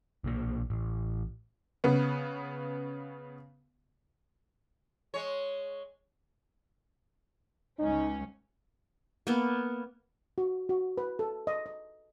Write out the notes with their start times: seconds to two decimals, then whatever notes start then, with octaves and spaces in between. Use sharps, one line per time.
0.24 B1 A#2 F#3 A#3
0.70 A1
1.84 C#3 B3
5.14 G#3 C#5
7.79 C#2 C#4 D#4
9.27 A#3 B3
10.38 F#4
10.69 F#4
10.98 B4
11.19 A4
11.47 D#5
11.66 D#5